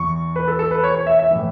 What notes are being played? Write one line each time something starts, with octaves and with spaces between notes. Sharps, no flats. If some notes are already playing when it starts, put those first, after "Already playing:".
Already playing: E2 E3 C#6
B4
A4
A4
B4
C#5
C#5
E5
E5
A2 E3